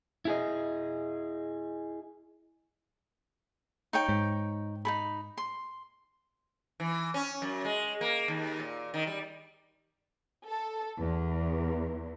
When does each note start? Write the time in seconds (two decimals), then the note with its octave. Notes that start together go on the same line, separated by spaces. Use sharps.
0.25 E4 G#4 D#5
3.93 D#4 C#5 G5
4.08 G#2
4.85 D#4 A4 B5
5.37 C6
6.80 E3
7.14 C#4
7.42 F#2
7.65 G#3
8.01 A#3
8.28 D#2
8.60 A#2
8.94 D#3
9.07 G3
10.47 A4
10.98 E2